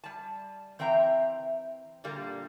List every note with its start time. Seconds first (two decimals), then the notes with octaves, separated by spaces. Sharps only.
0.04 G3 A5
0.79 E3 C4 E5 G5 A#5
2.04 A#2 D3 G3 A#3